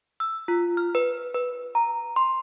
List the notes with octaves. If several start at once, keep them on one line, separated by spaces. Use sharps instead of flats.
E6
F4
F6
B4
B4
A#5
C6